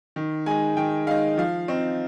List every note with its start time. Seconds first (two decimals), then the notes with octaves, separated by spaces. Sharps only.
0.16 D#3
0.46 G#3 D#4 G#5
0.77 D#3 G5
1.07 G#3 D#4 F5
1.38 F3 F5
1.68 C4 D#4